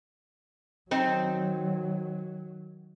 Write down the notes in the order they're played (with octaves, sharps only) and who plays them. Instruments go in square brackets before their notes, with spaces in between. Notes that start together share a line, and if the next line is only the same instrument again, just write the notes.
[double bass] D#3 F#3 [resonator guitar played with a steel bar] C4 D#4